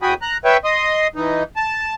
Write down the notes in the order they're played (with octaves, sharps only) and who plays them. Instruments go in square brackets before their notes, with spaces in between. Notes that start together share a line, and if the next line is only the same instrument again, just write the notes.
[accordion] E2 F#4 G5 G#5 B5 D#6
A#5 F#6
B4 C#5 E5 G5
D#5 C6 D#6
E3 D#4
A5